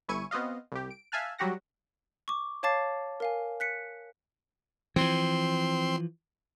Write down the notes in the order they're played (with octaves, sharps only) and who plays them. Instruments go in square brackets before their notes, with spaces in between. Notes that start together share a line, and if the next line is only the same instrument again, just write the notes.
[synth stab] G1 E4 G#5 C#6 C#7 D#7
B3 C4 F#4 D#5 F5
C2 G4
D7
E5 F5 G#5 A5 F6 F#6
F#3 G3 F#4 G4 F#5 A#6
[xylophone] C#6 D6
C#5 F5 A5 D6 A6 C7
A#4 F5 G#5
F#6 B6 C#7
[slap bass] E3 F3 [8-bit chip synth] C4 C6